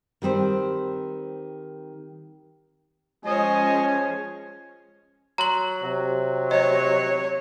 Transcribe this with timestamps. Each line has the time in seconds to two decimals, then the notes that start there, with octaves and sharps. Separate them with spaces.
0.22 D#3 G3 C4 C5
3.26 F3 G#3 C#4 C5 C#5 D#5 G#5
5.38 F#3 A#5 C6 F#7
5.84 C3 F#3
6.51 C#5 D#5